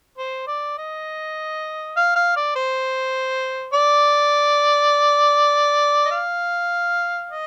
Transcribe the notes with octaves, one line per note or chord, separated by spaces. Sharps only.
C5
D5
D#5
F5
F5
D5
C5
D5
D#5
F5
D#5